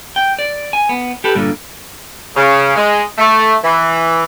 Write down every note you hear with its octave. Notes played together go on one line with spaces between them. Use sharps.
G5
D5
G#5
B3
G4 A4 B4
G2 A#2 D3
C#3
G#3
A3
E3